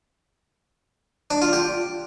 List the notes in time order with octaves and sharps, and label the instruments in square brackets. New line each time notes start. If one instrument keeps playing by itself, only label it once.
[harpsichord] D4
F4
G4